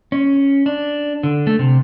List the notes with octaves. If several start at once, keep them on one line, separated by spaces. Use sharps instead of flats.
C#4
D4
D3
A3
C3